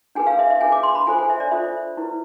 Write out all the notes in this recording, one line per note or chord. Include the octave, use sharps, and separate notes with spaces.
D4 G#4 B4 G#5
F5
E5
E5
D4 G#4 B4 G#5
D6
C6
B5
D4 F4 A4 C5 G#5
G#5
E5
D5
D4 F4 A4 C5 E5
E4 B4